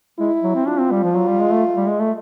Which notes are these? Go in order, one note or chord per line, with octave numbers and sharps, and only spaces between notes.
G#3 E4
F#3
C4
D4 F4
C4
G3
F3
F#3
G3
G#3
A3
G3
G#3
A3